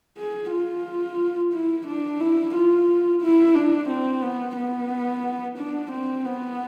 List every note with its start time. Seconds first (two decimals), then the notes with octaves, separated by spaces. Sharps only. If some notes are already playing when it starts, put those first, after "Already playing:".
0.18 G#4
0.52 F4
1.53 E4
1.87 D4
2.20 E4
2.55 F4
3.22 E4
3.55 D4
3.89 C4
4.23 B3
4.57 B3
5.58 D4
5.92 C4
6.25 B3